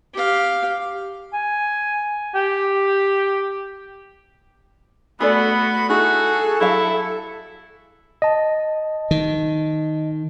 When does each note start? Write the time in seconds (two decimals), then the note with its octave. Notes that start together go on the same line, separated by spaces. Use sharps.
0.14 G4 F5
1.33 G#5
2.35 G4
5.20 A3 B3 F#4 G#4 A4 D5 B5
5.89 D#4 E4 F#4 G#4 A4
6.60 F#3 E4 G4 E5 F5
8.22 D#5 A5
9.11 D#3